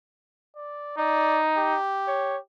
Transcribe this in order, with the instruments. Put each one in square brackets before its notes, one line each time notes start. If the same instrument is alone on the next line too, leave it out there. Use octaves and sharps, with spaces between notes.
[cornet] D5
[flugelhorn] D#4 [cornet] D5
[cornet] G4
[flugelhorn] C#5